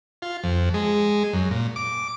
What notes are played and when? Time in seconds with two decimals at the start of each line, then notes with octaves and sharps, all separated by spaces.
0.22 F4
0.44 F2
0.74 G#3
1.33 F#2
1.51 A#2
1.76 D6